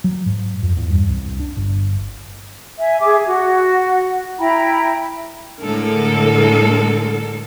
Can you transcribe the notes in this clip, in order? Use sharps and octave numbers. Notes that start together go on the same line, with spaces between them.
F#3
G#2
F2
E2
G2
C2
D4
G1
E5 G#5
G#4 E5 D6
F#4
E4 G5 A#5 B5
A2 D3 G#3 A4 A#4